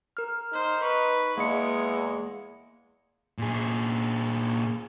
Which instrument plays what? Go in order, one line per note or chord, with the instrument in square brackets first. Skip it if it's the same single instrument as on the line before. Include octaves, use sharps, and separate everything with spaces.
[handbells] A#4 F6
[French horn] D#4 [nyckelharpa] C5
[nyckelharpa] B4 [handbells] C#6
[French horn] E2 [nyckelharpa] G#3 [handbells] A#3 D#5 C#7
[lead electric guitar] A#2 G#4